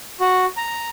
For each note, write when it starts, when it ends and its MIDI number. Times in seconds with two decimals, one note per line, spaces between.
0.20 0.45 66
0.57 0.90 82